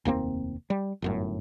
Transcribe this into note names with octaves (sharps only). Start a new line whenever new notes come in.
F1 D#2 A#3 C4
G3
G1 F#2 A2